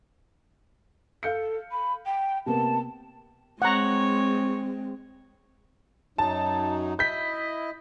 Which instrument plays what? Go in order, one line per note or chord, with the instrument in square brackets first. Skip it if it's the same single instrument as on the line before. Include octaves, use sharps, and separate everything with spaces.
[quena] A4 [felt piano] F5 G6 C#7
[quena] B5
G5
[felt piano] C3 A#3 B3 [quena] A5
[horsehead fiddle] G#3 C4 [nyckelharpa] C#5 C#6 [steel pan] F#5 A#5
[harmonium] F#2 F#3 D#4 [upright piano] A5
[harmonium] E4 D#5 [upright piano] G6 B6